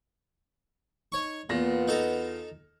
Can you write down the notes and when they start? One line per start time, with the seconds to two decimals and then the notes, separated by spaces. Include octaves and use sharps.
1.12 D#4 C#5 C#6
1.50 E2 A#2 B3 F4 A#6
1.88 D#4 A4 A#5